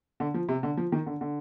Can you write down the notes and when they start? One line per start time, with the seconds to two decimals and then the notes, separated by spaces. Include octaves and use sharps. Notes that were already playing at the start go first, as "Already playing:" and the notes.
0.20 D3
0.34 F3
0.49 C3
0.63 D3
0.77 F3
0.92 D#3
1.06 D3
1.21 D3